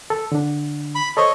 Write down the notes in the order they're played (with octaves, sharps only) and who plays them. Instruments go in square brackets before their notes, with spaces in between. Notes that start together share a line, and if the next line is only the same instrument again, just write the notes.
[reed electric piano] A4
D3 D4
[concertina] B5
[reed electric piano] A4 C5 [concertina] C#5 D#5